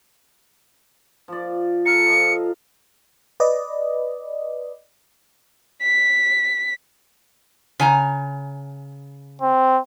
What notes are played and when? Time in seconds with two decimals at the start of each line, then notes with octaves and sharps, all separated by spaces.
1.28 F3 D5
1.86 A4 F5 A#5 C#7
2.06 F3 D#5
3.40 B4 D5 D#5
5.82 B6
7.80 C#3 G#5 A#5
9.42 C4